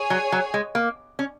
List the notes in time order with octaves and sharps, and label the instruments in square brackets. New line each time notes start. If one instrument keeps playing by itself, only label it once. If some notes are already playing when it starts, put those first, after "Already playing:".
Already playing: [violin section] G#4 C#5 G#5
[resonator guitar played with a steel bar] F#3
F#3
G#3
A#3
C#4